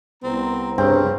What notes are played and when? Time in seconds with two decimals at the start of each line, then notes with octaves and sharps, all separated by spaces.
0.23 C2 B3 C4 A#5
0.78 G2 C#3 C4